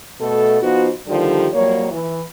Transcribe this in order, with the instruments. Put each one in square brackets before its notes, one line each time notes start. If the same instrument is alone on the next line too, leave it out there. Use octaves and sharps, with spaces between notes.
[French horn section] B2 A3 A4
F3 B3 D#4 F4 F#4 C5
D#2 D3 D#3 F3 G3 G4
F2 F#3 G3 A#3 C#5
E3